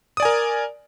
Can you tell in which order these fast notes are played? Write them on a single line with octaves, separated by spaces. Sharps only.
D#6 D5 G#5 A#4